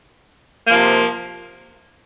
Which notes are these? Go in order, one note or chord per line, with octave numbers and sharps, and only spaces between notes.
C3 F3 A#3